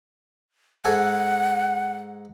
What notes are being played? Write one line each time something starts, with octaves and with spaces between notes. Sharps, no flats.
G#2 A4 F#5 G#5